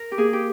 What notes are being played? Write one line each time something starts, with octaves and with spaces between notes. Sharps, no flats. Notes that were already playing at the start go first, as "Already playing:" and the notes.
Already playing: A#4
G4
A#3 G#4
G4